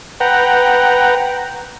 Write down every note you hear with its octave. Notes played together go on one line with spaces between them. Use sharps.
B4 F#5 G5 A#5